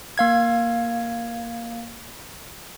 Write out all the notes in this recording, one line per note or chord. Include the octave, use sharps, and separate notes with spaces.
A#3 F5 G#6